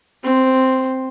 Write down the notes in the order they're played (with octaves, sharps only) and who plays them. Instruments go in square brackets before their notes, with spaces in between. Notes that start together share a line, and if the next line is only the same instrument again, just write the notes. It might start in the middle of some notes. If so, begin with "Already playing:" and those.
[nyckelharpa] C4 C6